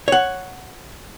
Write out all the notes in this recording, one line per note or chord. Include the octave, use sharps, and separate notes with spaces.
C#5 F#5